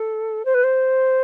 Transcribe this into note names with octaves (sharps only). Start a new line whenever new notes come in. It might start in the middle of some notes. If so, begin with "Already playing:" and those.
Already playing: A4
C5
B4
C5